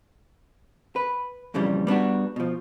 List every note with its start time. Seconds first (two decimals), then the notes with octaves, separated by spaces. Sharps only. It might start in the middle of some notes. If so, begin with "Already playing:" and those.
0.96 B4
1.54 F2 A#2 C#3 E3 G3
1.87 G3 B3 D4 F#4
2.36 B2 F3